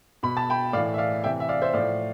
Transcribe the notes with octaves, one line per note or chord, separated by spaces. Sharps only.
B2 B5
A5
G5 B5
A2 E3 D5 F5
E5
D5 F5
C3 E3 E5 G5
E5
D5 F5
C5 E5
A2 F3 D5 F5